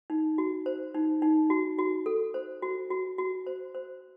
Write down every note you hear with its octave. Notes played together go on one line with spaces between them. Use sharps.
D#4
F#4
C5
D#4
D#4
F#4
F#4
A4
C5
F#4
F#4
F#4
C5
C5